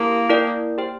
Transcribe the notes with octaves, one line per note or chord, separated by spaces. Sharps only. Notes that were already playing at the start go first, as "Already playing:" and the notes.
Already playing: A#3 E4 G4 A#4 F5
E4 A#4 D5 G5
G4 C5 G5